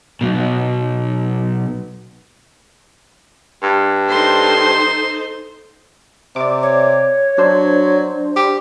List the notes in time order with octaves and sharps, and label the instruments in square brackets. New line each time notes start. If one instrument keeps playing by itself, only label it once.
[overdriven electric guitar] B1 B2
[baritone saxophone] G2
[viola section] D#4 A4 C5 [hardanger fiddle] C6
[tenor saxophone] C3 [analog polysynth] D5 D6
[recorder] C#5
[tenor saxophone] F#3 [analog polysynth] D4 C5
[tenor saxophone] G4